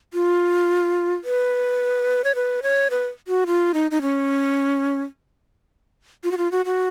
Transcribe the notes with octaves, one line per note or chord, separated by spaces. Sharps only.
F4
B4
C#5
B4
C#5
B4
F#4
F4
D#4
D#4
C#4
F4
F#4
F4
F#4
F#4